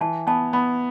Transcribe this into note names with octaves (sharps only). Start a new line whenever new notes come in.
E3 A5
B3 A5
B3 B5